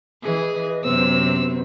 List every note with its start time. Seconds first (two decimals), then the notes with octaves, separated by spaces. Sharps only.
0.23 E3 G#4 B4 D#5
0.84 F#2 C3 F#3 B3 C5 E6